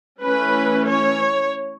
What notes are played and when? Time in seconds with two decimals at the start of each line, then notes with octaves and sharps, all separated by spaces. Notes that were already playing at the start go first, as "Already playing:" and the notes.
0.22 E3 A3 C#4 B4
0.88 C#5